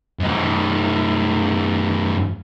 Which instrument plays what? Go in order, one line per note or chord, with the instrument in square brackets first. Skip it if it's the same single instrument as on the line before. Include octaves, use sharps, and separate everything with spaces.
[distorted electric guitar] F#2 D#4